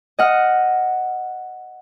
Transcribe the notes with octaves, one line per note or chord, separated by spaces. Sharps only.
D#5 F#5 F6